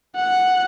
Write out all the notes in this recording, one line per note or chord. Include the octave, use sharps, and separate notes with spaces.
F#5